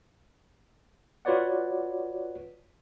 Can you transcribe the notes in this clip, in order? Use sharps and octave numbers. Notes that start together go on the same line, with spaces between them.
F4 F#4 B4 C#5 D5 F#5